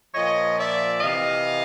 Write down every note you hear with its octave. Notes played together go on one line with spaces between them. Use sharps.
A#2 F3 C#5 D#5
D5 E5
C3 E3 D#5 F5